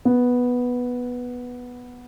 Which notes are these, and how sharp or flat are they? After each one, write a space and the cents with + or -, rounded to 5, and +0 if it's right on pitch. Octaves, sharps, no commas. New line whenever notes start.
B3 -5